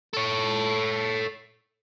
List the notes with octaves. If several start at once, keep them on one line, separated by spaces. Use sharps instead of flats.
A4 C#5